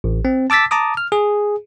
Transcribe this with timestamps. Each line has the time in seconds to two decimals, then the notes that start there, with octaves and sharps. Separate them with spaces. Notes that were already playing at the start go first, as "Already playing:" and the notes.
0.04 A1
0.25 C4
0.50 A5 D6 E6 A6 B6
0.71 A5 A#5 D6 D#6
0.97 F6
1.12 G#4